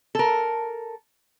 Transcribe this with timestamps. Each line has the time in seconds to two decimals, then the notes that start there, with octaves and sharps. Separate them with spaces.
0.15 A4 A#4